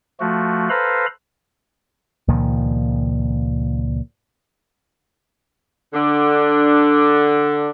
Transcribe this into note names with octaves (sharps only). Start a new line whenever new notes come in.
F3 A3 F#4
A4 B4 C5 F5 A#5 B5
C#2 A#2 D#3 F3
D3 D4